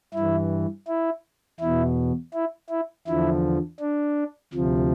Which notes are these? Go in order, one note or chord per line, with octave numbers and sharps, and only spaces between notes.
G2 E3 E4
E4
E2 B2 E4
E4
E4
E2 D3 F3 E4
D4
D2 C3 F3